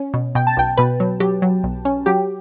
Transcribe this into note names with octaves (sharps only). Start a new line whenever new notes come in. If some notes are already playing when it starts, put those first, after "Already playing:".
Already playing: C#4
B2
B2 G5
A5
B1 G5
B2 B4
F#3
F#3 G4
F#3
B1
C#4
F#3 G4